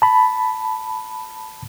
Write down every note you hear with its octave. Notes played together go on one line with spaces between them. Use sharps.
A5 B5